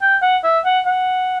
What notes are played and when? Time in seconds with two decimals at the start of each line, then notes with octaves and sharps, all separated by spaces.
0.02 G5
0.22 F#5
0.44 E5
0.65 F#5
0.86 F#5